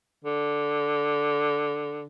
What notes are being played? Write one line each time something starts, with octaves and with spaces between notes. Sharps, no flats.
D3